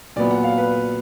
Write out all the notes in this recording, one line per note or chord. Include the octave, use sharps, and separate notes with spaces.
A#2 F#3 B3 D5
F#5
F5
B4